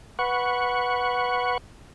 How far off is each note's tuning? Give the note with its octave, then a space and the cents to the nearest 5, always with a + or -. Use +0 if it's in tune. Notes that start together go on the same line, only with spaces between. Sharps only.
B4 +0 F#5 -10 C#6 +0